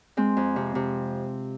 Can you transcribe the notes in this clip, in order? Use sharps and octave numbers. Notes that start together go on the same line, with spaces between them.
G#3 C4
F2
C3
C3